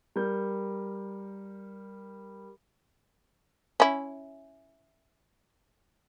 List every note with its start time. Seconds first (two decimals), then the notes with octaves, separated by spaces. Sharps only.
0.16 G3 A#4 G6
3.80 C#4 E4